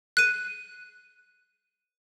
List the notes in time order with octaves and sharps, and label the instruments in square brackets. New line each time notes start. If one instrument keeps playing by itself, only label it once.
[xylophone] F#6 D#7